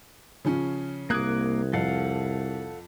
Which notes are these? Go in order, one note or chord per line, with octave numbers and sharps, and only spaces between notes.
C#3 F3 C#4
C2 A#3 D6 D#6 F#6 G#6
F2 A4 F5 F#5